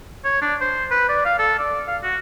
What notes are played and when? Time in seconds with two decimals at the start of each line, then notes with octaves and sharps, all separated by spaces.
0.24 C#5
0.42 D4
0.61 C5
0.91 B4
1.09 D5
1.25 F5
1.39 A4
1.59 D5
1.87 F5
2.03 F#4